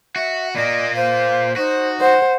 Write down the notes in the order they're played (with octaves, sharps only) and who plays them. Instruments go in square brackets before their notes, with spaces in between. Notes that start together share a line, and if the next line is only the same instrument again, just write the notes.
[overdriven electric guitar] F#4 [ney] E5
[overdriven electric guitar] A#2 A#3 [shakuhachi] D5 [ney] D#5
[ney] C5 [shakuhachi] F5
[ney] D#4 [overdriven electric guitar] F#4 [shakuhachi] C5
[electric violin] C5 [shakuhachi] F#5